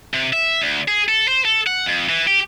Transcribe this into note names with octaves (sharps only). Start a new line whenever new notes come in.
C3
E5
D2
G#4
A4
C5
A4
F#5
F2
E3
G4